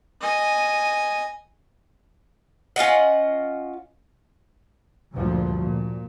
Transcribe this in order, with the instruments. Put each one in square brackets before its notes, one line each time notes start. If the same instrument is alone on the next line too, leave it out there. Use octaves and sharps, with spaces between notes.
[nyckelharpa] D#5 G#5
[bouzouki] C#4 F4 D#5 F#5
[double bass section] D2 G2 A#2 F3
A#2